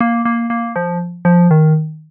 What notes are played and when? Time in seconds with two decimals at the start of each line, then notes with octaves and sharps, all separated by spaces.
0.01 A#3
0.25 A#3
0.50 A#3
0.76 F3
1.25 F3
1.51 D#3